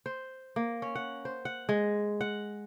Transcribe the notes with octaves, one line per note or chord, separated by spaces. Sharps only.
C5
A#3
C#4
F#5
C5
F#5
G#3
F#5